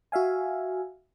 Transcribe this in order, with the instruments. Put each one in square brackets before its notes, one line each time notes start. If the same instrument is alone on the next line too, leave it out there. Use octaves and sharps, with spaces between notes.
[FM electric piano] F#4 E5 F5 G#5